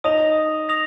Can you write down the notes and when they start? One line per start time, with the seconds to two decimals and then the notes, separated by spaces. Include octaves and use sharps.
0.04 D#4 D#5 D#6 A#6 F7
0.69 D#6 A#6 F7